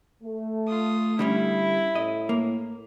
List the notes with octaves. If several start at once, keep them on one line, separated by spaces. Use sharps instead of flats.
A3
F4 D#6
D3 G3 C#4 E4
A2 D#5
A#3